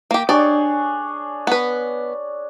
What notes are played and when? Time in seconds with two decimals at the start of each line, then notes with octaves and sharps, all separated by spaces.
0.11 A#3 G4
0.29 D4 G4 G#4 C#5 D5
1.47 B3 B4